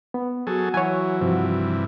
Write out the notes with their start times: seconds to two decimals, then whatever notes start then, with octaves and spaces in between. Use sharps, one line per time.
0.14 B3
0.47 F#3 F#4 G#4 A4
0.74 E3 F#3 C#5 G#5
1.21 G2 C3 E3 F3